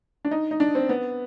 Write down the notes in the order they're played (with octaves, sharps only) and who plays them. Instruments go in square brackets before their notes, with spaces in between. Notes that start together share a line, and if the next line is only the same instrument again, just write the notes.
[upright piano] D4
D#4
D#4
D4
C4
B3